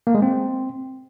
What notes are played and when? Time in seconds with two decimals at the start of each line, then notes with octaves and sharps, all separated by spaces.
0.07 A#3
0.15 G#3
0.22 C4